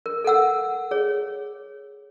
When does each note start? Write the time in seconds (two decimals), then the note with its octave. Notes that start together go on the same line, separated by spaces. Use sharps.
0.06 A#4
0.24 A4 A#4 F#5 E6
0.91 G#4 C#5